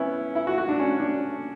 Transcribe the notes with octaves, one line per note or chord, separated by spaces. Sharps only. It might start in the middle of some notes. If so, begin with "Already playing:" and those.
Already playing: B3 C#4 E4
E4
F#4
F#4
D4
C#4
D4